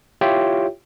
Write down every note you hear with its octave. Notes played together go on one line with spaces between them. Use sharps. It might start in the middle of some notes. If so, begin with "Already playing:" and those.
E4 F4 G4 C#5 E5 G5